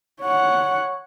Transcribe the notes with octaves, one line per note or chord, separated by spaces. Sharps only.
C#5 F#5